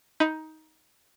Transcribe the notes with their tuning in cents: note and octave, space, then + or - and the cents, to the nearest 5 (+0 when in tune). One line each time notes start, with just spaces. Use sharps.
D#4 +15 B5 +0